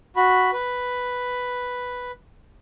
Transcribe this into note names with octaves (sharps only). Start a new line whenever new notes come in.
F#4 B5
B4